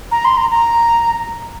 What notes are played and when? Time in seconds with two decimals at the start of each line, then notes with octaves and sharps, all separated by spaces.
0.11 A#5
0.25 C6
0.37 A#5
0.51 A#5